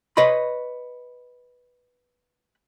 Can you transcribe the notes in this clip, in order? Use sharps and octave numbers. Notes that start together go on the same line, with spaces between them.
B4 C#5 D#5 B5 C6